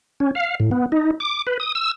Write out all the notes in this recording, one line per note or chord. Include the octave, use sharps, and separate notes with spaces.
C#4
F5
A2
B3
D#4
D6
B4
D#6
E6